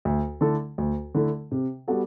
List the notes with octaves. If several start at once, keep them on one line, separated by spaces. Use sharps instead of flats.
D2
D3 A3 E4 A4
D2
D3 A3 E4 A4
C3
G3 B3 F#4 A4